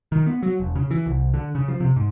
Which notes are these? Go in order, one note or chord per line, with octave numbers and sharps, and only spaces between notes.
D#3
B3
F#3
E1
C#3
E3
C2
D3
C#3
F3
C3
G#2